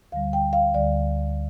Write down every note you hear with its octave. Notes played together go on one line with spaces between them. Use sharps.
D2 D3 G3 F5
G5
F5
D2 D3 G3 D5